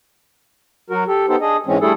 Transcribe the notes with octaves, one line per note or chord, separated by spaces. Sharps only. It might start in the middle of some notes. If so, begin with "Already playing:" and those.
F#3 F#4 A#4
G4 A4
B3 D#4 G4 A4 C5
D4 G#4 D#5
G#2 E3 G#3 C4 C#4
G3 A3 D4 E4 G#4 A4